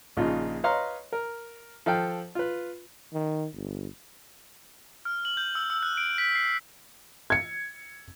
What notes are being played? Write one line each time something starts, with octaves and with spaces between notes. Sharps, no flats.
A#1 C#3 D#4 F4
B4 C#5 D#5 F5 A#5 C6
A#4
F3 A4 F5 G5
F4 B4
D#3
G1
F6
F#7
G6
E6
E6
F#6
D7
B6
C7
G#6 C#7